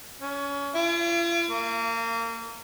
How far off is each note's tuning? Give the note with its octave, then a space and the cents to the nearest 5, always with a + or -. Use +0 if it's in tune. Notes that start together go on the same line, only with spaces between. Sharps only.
C#4 +25
F4 -45
A#3 -30